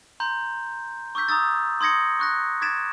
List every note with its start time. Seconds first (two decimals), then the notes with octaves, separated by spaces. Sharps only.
0.20 A#5 C6 G6
1.15 C#6 D6 E6 G6 B6
1.28 A#5 D#6 E6 A6
1.81 C6 D#6 G#6 A#6 C#7
2.19 C#6 F#6 A#6
2.62 D6 G#6 A6 B6 D7 E7